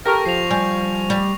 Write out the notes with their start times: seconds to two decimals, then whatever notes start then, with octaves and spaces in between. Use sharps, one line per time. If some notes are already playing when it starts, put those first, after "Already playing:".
0.06 G4 A4 A#4 C#6 A#6
0.26 F3 C7 F7
0.51 G3 G#5
1.10 G3